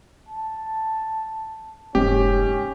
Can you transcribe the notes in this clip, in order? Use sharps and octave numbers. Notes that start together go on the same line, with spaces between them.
A5
F1 G#2 C#4 G4